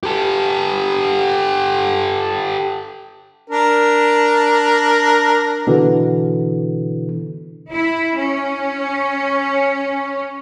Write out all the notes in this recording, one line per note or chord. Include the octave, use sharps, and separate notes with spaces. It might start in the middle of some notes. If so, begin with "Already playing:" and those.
G4 A4
D4 A#4
B2 D3 E3
E4
C#4